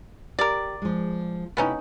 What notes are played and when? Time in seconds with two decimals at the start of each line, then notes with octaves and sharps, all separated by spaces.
0.39 G4 A#4 D5
0.82 F3 G#3
1.57 C3 A3 B3 C#4 D#4 E4